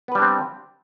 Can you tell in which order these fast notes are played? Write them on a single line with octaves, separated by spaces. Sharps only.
B3 B4 G3 D4 C4